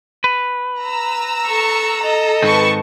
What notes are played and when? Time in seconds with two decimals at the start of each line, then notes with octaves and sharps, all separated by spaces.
0.24 B4
0.81 A#5 E6
1.47 A4 C#6
2.01 A4 D#5
2.43 G#2 D#3 C4 B4 A5 C#6